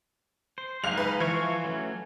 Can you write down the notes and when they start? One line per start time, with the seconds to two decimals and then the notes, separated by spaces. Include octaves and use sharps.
0.58 C5
0.84 F#1 G#3 D#4 F5 F7
0.97 B4 F5
1.20 E3 F3 F5 C#6
1.64 F#3 A3 C#4